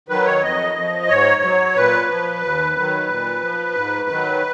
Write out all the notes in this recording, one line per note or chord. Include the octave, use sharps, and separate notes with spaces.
D#3 F#3 B4
C#5
F2 D#5
F3
G#2 C#5
F#3
A#2 B4
F3
D#2
D#3 F#3
A#2
F3
G#2
D#3 F#3